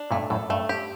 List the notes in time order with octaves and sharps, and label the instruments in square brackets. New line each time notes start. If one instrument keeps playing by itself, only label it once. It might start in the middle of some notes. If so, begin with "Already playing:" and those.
Already playing: [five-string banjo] D4
[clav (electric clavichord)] G2 A#2 [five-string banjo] A3
[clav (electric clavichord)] F#2 A2 [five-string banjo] A4
[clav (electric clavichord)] G2 [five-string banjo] A3
[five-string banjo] G4